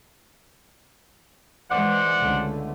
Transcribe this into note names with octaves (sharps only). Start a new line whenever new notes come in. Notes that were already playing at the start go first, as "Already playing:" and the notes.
E3 G#3 C5 D5 F#5
C#2 D3 A3